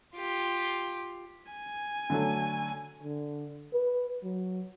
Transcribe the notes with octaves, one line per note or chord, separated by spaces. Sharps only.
F4 G4
G#5
D3 F#3 A3
D3
B4
F#3